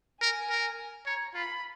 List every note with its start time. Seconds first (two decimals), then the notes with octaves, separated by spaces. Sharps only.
0.21 A#4 G#5
0.50 A#4
1.06 C#5 A#5
1.34 F4 B5